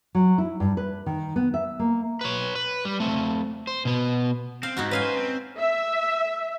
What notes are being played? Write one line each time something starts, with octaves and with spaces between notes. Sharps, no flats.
F#3
E4
G2
B4
D#3
B3
E5
A#3
B4 C#5
B4
G3
A3 C4
C5
B2 B3
C4 F5
E2 G#2 D#4 E4 F#4
C#4 B4 F5 G#5
C5
C4
E5